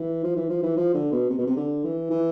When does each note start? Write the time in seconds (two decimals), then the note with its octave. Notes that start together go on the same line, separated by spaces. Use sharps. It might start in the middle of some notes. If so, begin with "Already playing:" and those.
Already playing: E3
0.23 F3
0.36 E3
0.49 F3
0.63 E3
0.77 F3
0.94 D3
1.12 B2
1.30 C3
1.38 B2
1.47 C3
1.56 D3
1.84 E3
2.10 E3